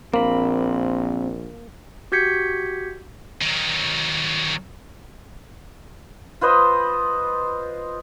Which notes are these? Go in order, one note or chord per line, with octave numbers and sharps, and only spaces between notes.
A#1 A#3 C4 B5
F#4 G4 G6 G#6 B6 C#7
D#3 F#3
F4 B4 C5 D#5